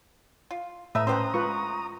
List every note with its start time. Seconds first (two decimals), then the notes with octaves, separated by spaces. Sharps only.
0.51 F4
0.95 A2 A3 B4 E5 A#5 D#6
1.07 D3 C#4 G4 B4 C5
1.34 G#3 F4 B4 C#6